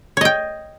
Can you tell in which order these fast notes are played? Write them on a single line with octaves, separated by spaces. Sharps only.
C#5 D#5 G5